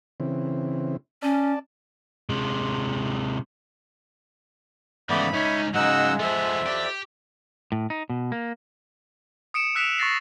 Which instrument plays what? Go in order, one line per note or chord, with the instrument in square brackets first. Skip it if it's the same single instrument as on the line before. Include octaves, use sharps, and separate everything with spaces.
[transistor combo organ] C#3 E3 C4
[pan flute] C#4 [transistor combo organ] D5 A5
[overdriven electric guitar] C3 G#3
[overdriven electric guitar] G#2 C#3 [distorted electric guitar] E3 [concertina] A3 B3 D5 [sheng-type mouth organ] B5
[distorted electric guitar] C#2 C#4 [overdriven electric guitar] D#4 [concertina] C#5 E5
[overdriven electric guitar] G#2 C#3 [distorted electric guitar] F#3 [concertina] G#3 [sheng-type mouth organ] D#4 F#5 E6
[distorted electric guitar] F3 B3 [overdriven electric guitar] A4 C5 [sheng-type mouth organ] E5
[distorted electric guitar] G4 [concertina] D5
[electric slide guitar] A2
D#4
B2
A#3
[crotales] D#6 C#7 D7 E7
E6 F#6 B6 D7 E7 F7
C#6 A6 A#6 C7